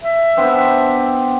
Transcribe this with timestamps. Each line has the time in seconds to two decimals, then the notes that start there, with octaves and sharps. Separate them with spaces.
0.04 E5
0.37 B3 C4 D4